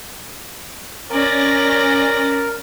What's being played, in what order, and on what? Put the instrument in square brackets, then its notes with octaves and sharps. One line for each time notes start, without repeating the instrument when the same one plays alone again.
[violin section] C#4 D5 A#6 [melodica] A#4